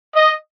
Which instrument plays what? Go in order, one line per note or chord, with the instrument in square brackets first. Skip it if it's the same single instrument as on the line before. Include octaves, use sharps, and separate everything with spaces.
[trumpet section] D#5